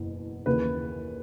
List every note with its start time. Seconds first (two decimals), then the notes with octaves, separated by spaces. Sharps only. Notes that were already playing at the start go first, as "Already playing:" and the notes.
Already playing: F#1 E2 B2
0.46 D#2 C#3 E3 B4